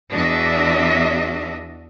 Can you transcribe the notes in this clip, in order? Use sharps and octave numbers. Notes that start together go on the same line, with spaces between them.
E2 D4 F#4 D#5 E5